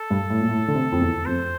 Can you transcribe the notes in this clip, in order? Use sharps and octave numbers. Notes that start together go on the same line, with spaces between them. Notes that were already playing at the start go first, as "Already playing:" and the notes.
Already playing: A4
G2
A2
A#2
A2
D3
C3
F2
E2
F2 C5